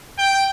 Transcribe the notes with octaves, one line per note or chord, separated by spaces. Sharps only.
G5